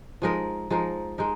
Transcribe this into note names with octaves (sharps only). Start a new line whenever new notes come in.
F3 G#3 D#4 A#4
F3 G#3 D#4 A#4
G#3 D#4 A#4